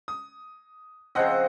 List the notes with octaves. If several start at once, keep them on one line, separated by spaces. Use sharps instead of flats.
D#6
C#3 F3 C4 D#5 F#5